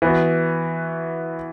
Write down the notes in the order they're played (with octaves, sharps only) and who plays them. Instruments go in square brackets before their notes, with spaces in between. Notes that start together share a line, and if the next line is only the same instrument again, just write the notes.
[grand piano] E3 B3 F#4